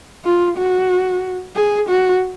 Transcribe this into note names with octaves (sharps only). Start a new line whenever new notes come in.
F4
F#4
G#4
F#4